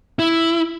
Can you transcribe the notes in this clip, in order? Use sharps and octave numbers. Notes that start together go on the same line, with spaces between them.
E4